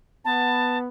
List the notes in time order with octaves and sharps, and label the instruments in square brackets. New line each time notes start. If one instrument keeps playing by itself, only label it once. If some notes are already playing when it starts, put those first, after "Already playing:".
[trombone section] B3 [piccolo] A5